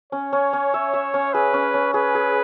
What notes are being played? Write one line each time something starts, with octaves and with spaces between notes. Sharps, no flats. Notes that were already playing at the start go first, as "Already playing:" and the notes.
C#4 C#5
C#4
C#4
E5
E5
C#4
G#4 B4
C#4
C#4
G#4 B4
G#4